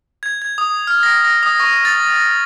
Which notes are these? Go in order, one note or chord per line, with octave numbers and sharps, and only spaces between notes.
G#6
G#6
D#6
F6
A#6
A#6
D#6
C#6
A6
A#6